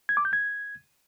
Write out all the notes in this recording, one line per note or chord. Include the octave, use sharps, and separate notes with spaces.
G#6
D6
G6
G#6